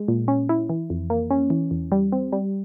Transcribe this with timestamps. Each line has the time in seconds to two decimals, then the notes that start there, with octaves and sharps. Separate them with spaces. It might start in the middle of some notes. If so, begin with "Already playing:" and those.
Already playing: G#3
0.08 A#2
0.28 C#4
0.49 E4
0.69 E3
0.90 F2
1.10 A#3
1.30 C#4
1.50 E3
1.71 E2
1.92 G3
2.12 C4
2.33 G3